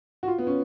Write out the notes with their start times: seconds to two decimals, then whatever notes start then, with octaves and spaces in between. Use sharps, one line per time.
0.23 F#4
0.28 F4
0.38 B3
0.47 C#4